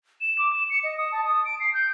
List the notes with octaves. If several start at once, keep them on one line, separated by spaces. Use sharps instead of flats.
E7
D6
E7
C#7
D#5
D#6
A5
D#6
D7
C7
G6